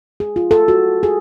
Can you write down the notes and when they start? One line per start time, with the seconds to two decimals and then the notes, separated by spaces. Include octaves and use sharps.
0.20 G#4
0.36 F4
0.51 A4
0.68 F#4
1.03 G#4